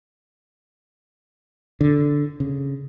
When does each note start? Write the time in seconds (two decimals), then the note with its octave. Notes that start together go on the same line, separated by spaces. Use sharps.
1.81 D3
2.40 C#3